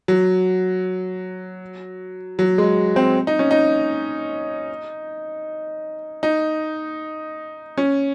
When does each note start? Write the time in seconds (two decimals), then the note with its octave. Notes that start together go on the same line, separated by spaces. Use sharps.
0.08 F#3
2.39 F#3
2.58 G#3
2.96 C4
3.27 D#4
3.39 C#4
3.51 D#4
6.23 D#4
7.78 C#4